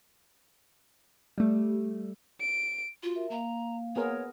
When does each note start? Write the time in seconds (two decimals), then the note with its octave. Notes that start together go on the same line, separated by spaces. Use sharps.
1.38 G3 A3
2.40 D7
3.03 F4 F#4
3.16 A#4 E5
3.30 A#3 F5 A#5
3.96 B3 G#4 A#4 C#5